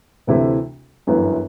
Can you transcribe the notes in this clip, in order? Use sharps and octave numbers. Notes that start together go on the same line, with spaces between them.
D2 C3 E3 A3 E4
G1 F#2 E3 B3